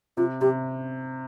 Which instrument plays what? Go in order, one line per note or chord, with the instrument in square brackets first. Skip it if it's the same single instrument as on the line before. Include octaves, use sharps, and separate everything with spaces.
[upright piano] C3 [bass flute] F4
[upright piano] C3 [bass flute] G4